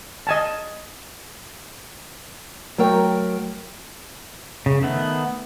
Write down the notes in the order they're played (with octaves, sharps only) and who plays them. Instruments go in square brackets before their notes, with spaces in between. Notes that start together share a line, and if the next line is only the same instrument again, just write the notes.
[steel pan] D#5 G#5 A5
[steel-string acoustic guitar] F#3 A3 A#4 G5
[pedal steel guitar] C#3
D#3 A3 B3